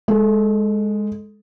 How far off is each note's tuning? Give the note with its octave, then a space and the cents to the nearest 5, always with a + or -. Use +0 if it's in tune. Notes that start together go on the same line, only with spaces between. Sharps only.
G#3 +0 A4 -10